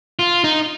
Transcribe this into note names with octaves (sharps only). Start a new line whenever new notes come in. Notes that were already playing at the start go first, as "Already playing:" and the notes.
F4
D#4